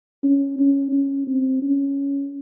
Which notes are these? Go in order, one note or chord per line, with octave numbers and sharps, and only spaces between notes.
C#4
C#4
C#4
C4
C#4